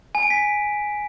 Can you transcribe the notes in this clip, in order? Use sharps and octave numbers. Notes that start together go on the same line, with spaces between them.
G#5
D7
B6